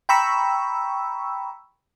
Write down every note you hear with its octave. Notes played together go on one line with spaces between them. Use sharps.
G5 A#5 B5 C#6 E6